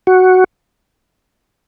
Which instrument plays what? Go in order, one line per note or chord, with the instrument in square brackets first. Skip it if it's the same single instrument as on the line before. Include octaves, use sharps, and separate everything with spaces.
[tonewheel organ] F#4